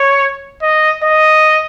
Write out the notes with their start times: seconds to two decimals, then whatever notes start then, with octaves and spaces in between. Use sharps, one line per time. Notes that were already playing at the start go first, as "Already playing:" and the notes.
Already playing: C#5
0.63 D#5
1.04 D#5